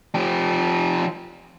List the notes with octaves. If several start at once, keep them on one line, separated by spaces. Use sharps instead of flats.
F3 G4